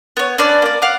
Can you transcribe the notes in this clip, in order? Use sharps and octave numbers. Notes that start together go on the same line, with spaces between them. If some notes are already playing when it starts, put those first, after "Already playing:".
B3 C#5
C#4 D4 B4 D5
A#3 D5
F5 F#5 D6